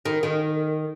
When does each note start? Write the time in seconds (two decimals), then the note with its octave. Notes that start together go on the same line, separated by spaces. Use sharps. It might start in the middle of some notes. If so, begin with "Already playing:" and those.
0.05 D#3
0.23 D#3